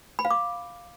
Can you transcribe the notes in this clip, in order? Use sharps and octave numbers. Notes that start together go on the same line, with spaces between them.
B5
F5
D6